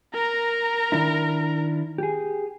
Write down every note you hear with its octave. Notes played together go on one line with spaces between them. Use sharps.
A#4 A#5
D#3 D4 E4
G4 G#4